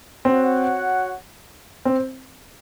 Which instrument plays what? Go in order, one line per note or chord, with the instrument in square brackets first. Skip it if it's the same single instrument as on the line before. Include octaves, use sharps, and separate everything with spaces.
[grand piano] C4 [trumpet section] F#4 C#5 F#5
[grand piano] C4